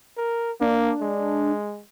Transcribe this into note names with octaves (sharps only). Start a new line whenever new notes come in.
A#4
A#3 D4
G#3